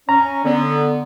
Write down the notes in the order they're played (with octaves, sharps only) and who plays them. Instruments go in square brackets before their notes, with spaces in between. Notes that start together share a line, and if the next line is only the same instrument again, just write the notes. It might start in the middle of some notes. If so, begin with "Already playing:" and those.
[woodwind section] C#4 [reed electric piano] A#5
[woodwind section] D3 B3